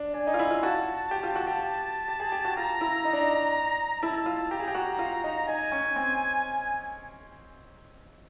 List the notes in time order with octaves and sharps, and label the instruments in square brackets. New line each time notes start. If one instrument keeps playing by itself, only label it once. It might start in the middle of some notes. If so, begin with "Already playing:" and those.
Already playing: [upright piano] D4
[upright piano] D4 [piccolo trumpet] G#5
[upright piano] D#4
F4
E4
F4
[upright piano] F#4 [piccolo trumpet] A5
[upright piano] G4
F4
F#4
G4
G4
G#4
G4
F#4
[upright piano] F4 [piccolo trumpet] A#5
[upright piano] E4
D#4
D4
D#4
[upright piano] E4 [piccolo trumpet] A5
[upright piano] F4
[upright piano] G4 [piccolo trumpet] A#5
[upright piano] G#4
G4
F#4
F4
D#4
[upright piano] D#4 [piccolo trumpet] G#5
[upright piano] C#4
C4